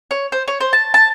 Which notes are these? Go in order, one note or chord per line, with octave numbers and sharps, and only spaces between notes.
C#5
C5
C#5
C5
A5
A5